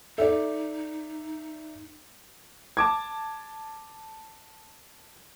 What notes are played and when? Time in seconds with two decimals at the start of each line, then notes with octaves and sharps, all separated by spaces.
0.18 D#4 A4 D5 E5
2.77 A5 D6 G#6